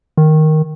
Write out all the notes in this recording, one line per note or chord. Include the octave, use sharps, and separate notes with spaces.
D#3